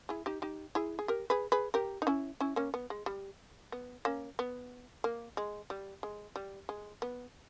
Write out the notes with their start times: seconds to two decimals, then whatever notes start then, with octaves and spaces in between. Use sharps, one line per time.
0.09 E4 G#4
0.26 D#4 G4
0.42 D#4 G4
0.75 E4 G#4
0.99 G#4
1.08 G4 A#4
1.30 G#4 B4
1.52 G#4 B4
1.74 G4 A#4
2.02 D#4
2.07 C#4 E4
2.40 C#4 E4
2.56 A#3 C#4
2.74 B3
2.90 G#3
3.06 G3
3.72 B3
4.05 A#3 C#4
4.39 B3
5.04 A#3
5.37 G#3
5.70 G3
6.03 G#3
6.36 G3
6.69 G#3
7.02 B3